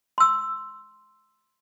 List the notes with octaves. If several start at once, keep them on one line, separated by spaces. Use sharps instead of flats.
C6 E6